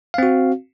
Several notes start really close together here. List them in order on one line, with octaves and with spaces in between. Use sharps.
F5 C4 F#4